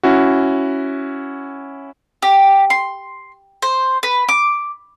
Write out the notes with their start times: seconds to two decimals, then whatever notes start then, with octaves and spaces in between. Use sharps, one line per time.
0.03 C#4 E4 F#4
2.22 G4
2.70 C6
3.62 C5
4.03 B4
4.29 D6